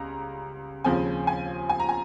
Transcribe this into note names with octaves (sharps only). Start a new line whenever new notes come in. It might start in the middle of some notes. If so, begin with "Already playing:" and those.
Already playing: C#2 G3 A#5
D#2 C#3 F3 C4 G#5
G#5
G#5
A#5
G#5